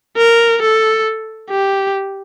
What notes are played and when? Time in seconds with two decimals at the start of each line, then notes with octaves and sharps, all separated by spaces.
0.17 A#4
0.62 A4
1.50 G4